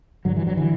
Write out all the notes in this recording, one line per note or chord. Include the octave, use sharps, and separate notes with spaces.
G2 D3 F#3
E3
F#3
D3 E3